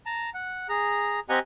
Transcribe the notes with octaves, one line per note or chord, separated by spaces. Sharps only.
A5 A#5
F#5
G#4 A#5
C4 G4 D#5 F#5 G#5 A#5